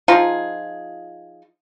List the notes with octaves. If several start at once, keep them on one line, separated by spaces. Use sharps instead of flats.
F3 D#4 F4 G#4